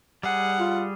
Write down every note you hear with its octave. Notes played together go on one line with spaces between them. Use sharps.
G3 G#4 F#5
F4